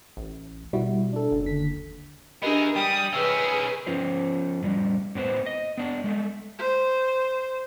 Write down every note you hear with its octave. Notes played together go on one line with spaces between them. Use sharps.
A1
B2 G3 E4 F#4
D4 A4
F#1
D#2 D3 B6
B3 D4 E4 G4 G#4 A#4 D#5
G3 G5 D#6
D#3 C#4 G#4 B4 E6
F3 C#4 F4 C5
A2 G3
A2 B3 C4 B4 C5
D#5
B3 D4
G#3 A3
C5